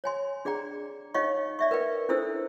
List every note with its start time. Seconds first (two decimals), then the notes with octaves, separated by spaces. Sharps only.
0.04 C#5 G#5 C6
0.45 D4 G#4 D5 G5 A#5
1.14 D#4 C#5 D#5 F5 G5 C#6
1.59 D5 E5 C#6
1.71 A#4 B4 D5 G5
2.09 C#4 D4 E4 A4 C5 E6